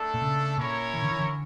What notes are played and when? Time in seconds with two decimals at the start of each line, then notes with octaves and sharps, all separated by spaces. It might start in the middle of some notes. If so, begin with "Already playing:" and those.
Already playing: A3 D4 A4
0.14 A#2
0.21 C#3
0.57 A#2 C#4 E4 A#4 C#5
0.94 E3
1.03 D3
1.11 E3
1.20 D3